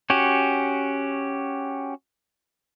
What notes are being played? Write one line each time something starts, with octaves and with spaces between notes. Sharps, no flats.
C#4 F#4 G4